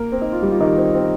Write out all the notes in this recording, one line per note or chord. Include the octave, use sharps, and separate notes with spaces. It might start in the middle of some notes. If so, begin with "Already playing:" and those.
Already playing: A#3 A#4
C4
D#4
F4
G3 G4
F4
D#3 D#4
C4
C4